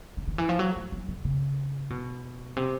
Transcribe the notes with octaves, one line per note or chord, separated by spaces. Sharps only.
D3
D#3
E3
F3
F#3
A3
F#3
D3
C#3
B2
C3